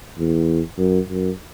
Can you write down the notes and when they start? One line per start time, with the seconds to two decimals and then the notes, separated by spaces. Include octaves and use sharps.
0.18 E2
0.78 F#2
1.09 F#2